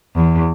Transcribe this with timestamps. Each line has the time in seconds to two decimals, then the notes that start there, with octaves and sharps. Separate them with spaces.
0.15 E2